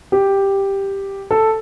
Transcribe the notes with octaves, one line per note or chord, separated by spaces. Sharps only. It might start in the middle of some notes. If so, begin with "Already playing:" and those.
G4
A4